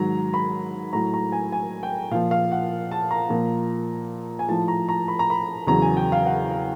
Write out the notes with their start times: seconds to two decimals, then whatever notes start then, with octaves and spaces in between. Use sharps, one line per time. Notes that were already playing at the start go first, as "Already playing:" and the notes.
Already playing: G#2 D#3 F#3 A#5
0.34 B5
0.93 A2 F#3 A#5
1.14 A#5
1.32 G#5
1.52 G#5
1.83 G5
2.11 A#2 F3 F5
2.31 F5
2.51 F#5
2.92 A5
3.11 A#5
3.30 A#2 F3
4.39 G#5
4.48 A2 F3 A5
4.68 A#5
4.89 A#5
5.08 B5
5.19 A#5
5.30 B5
5.67 E2 C#3 F#3 A#5
5.82 G#5
5.97 G5
6.12 F5
6.26 F#5